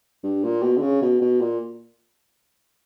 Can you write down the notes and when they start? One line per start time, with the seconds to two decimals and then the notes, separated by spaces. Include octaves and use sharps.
0.23 G2
0.44 A#2
0.63 B2
0.77 D3
0.81 C#3
1.02 B2
1.21 B2
1.41 A#2